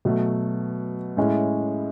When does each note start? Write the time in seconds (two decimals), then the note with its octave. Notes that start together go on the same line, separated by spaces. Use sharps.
0.05 B2 F#3 A3
1.17 A2 G#3 C#4 E4